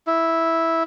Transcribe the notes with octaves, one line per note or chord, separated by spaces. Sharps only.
E4